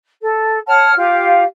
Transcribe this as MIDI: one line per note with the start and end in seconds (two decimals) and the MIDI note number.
0.21 0.58 69
0.67 0.93 73
0.67 0.93 78
0.67 0.93 81
0.67 0.93 89
0.97 1.43 65
0.97 1.43 67
0.97 1.43 77